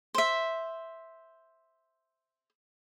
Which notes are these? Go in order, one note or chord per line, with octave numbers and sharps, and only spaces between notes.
C5 E5